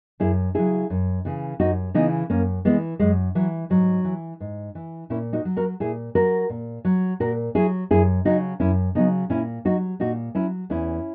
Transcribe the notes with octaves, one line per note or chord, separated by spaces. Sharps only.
F#2 E4 G#4
C#3 F#3 E4 G#4
F#2
C#3 E3
F#2 D#4 F#4
C#3 E3 B3 D#4
F#2 A#3 C#4
E3 G#3 B3
F#2 G#3
E3 F#3
G#2 F#3
E3
G#2
E3
A#2 C#4 E4
D#4 F#4
F#3
F#4 A#4
A#2 E4 G#4
F#3 F#4 A#4
A#2
F#3
A#2 F#4 A#4
F#3 E4 G#4
F#2 E4 G#4
C#3 F#3 D#4 F#4
F#2 C#4 E4
C#3 F#3 B3 D#4
A#2 C#4 E4
F#3 D#4 F#4
A#2 D#4 F#4
F#3 C#4 E4
E2 C#4 E4